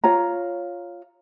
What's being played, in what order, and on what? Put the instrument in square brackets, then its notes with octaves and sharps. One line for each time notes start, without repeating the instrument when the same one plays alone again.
[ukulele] F4 C#5 A#5